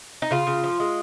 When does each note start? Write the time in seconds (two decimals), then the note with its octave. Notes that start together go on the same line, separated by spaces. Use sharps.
0.22 D#4
0.31 C#3 F4
0.47 C#3
0.64 F3
0.80 G#3